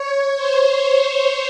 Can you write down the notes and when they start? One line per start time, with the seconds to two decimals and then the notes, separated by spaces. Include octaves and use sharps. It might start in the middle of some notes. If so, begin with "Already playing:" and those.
Already playing: C#5
0.35 C5